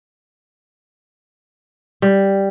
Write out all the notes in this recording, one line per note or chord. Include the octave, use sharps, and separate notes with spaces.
G3